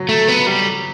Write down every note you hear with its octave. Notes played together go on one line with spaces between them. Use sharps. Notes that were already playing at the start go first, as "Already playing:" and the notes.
Already playing: F#3
A3
B3
G3